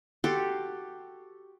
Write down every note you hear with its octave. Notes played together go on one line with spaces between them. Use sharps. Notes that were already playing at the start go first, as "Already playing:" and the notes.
F#4 G4 A4 C6